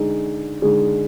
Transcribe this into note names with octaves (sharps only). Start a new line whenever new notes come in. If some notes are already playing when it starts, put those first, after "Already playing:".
Already playing: D3 G#3 D#4 G#4
D3 G#3 D#4 G#4